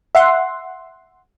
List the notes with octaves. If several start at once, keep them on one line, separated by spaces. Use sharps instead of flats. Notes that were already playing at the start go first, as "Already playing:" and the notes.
E5 F#5 C6